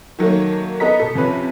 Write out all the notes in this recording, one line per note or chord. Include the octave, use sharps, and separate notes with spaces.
D#3 F#3 A3 A#3
B3 A4 D#5 A#5 B6
B2 A4
C3 F3 C#4 B4